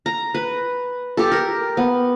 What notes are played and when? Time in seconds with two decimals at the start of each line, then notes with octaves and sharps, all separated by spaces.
0.06 A#5
0.34 B4
1.17 G4 A4
1.32 A#4
1.77 B3